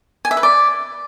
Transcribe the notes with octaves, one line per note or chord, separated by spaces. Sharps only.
G#5
E5
B4
D5